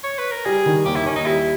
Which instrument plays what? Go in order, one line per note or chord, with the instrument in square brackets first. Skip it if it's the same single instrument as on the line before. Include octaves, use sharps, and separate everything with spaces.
[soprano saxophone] C#5
B4
A#4
[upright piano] G3 [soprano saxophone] G#4
[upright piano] D#3
[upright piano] D#2 [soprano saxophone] G4
[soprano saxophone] E4
[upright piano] D#2 [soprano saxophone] C#4
[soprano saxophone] D#4
[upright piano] G3 [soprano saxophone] E4